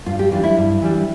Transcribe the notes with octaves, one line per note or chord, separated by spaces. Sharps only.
G2 F4
G4
E3 G3 D4 F4
E4
G2
E3 G3 D4